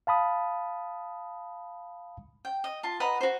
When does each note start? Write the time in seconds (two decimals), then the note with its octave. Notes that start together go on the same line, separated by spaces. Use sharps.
0.07 F5 A5 B5 D#6
2.45 G5
2.64 D#5
2.83 F4 A5
3.00 B4 D#5 F#5 A#5
3.21 F#4 C5